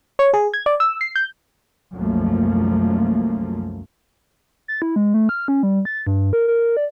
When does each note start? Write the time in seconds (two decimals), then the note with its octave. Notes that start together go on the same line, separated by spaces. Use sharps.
0.19 C#5
0.34 G#4
0.54 G#6
0.66 D5
0.80 E6
1.01 C7
1.16 G6
1.94 C2 F#2 F3 A3 A#3
4.68 A6
4.82 E4
4.96 G#3
5.14 A3
5.29 F6
5.48 C#4
5.63 G3
5.85 A6
6.07 G2
6.33 A#4
6.48 A#4
6.77 D5